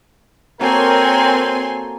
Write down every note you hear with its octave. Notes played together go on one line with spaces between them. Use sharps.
A#3 C4 F#4 A4 A#4 C#5 G#5 C6